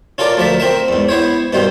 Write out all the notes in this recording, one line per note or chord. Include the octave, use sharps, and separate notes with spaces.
C#4 F4 A4 A#4 D5
D2 F3 A#4 E5
C4 A#4 E5
E2 G#2
B3 E4 C5 C#5
G2 B2 D#3 C5